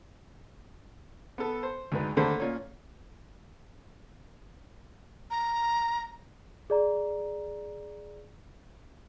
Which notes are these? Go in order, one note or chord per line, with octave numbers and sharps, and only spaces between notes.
B3 A4
C5
D2 G#2 B4
D#2 D3 A3 A4 C5 B5
A#2 C#4
A#5
G#4 D5 A#5